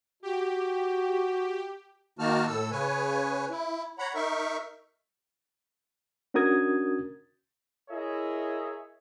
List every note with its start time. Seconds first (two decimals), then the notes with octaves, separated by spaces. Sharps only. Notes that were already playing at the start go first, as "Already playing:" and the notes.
0.23 F#4 G4
2.19 D#3 A#3 D#4 F#4 A5 F6
2.47 A2 A4 E6
2.71 C#3 B4 C#5 G#5
3.50 E4
3.99 C#5 F#5 A#5 B5
4.15 D#4 A#4 E5 C#6
6.34 C#4 D4 F#4 A#4 D#6 G#6
7.90 E4 G#4 A#4 C#5 D#5 E5